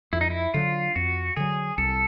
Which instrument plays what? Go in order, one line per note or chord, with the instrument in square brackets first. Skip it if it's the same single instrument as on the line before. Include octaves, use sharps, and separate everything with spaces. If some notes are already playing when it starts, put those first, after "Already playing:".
[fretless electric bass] F2 [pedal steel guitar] E4
[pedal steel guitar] D#4
E4
[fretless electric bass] D3 F#3 [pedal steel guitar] F4
[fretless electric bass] F2 [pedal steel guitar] F#4
[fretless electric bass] D3 F#3 [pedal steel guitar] G#4
[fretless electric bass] C2 [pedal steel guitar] A4